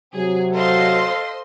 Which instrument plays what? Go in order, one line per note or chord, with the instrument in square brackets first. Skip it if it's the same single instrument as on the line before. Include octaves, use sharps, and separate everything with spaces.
[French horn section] C3 F#3 [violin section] G#4
[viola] A4 F5 [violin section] C5 D#5 C6